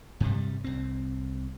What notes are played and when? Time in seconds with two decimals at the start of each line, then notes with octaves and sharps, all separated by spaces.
0.20 G2 C3 G3
0.64 C2 C4